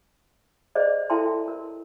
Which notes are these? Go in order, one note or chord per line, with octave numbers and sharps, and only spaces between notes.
G#4 C5 D5 D#5
E4 A4 E5 G5 A5 C6
A#4